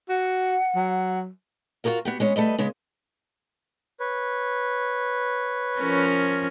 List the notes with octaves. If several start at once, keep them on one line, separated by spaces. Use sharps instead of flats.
F#4 F#5
F#3
F4 F#4 G#4 A#4 F5
B3 F#4 G4
G#3 B3 C#4
G3 A3 B4 D#5
C#3 G#3 B3
B4 C#5
F3 C#4 A#4